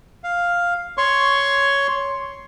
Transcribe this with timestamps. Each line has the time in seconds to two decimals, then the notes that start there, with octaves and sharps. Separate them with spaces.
0.24 F5
0.98 C#5 C6 C#6